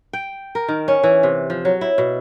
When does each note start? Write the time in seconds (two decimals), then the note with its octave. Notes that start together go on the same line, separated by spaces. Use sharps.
0.13 G5
0.55 A#4
0.68 D#3
0.88 C#4
1.03 E3
1.23 C3
1.50 F3
1.65 F#3
1.81 E4
1.98 B2